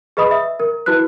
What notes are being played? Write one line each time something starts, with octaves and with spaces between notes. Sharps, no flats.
G#4 B4 D#5 B5 D#6
E5
A#4
E4 F#4 B4 F#6